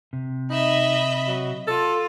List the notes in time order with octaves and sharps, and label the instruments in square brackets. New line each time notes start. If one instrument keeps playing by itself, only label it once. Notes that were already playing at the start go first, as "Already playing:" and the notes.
[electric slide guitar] C3
[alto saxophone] D#4 [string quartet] D#5 E5 B5
[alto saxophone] F#3
[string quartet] F4 [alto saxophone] A4